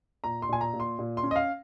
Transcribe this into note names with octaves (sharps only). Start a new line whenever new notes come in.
A#2 A#5
C6
A#2 G#5
A#5
A#2
C6
A#2
C6
C#4
D#5
F5